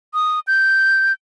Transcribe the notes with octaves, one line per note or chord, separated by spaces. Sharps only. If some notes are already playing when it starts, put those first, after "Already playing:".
D#6
G6